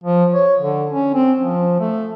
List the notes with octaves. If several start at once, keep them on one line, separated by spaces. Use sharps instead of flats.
F3
C#5
D3
C#4
C4
F3
A3